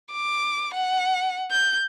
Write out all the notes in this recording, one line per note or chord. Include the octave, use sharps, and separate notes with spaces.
D6
F#5
G6